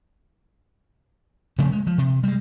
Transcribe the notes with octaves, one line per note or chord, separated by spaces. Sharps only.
C3 F3 A3 C#4
G#3
F3
C3
G3 G#3